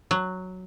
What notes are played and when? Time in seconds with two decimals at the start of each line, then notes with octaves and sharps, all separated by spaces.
0.11 F#3